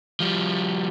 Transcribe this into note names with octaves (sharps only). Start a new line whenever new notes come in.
F3 G3